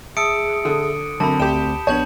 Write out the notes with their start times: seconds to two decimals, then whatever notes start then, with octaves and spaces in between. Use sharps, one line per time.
0.17 G#4 E5 A5 D#6 E6 C#7 D7
0.65 D3
1.20 F#2 D3 C4 A5 B5
1.40 D2 G4 G5 E7
1.87 A#1 B3 D4 C#5 A5 G6 F#7